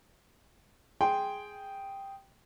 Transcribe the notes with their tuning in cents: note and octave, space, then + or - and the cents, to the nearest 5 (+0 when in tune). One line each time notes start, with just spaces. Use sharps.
G#4 +0 G5 +0 C6 +0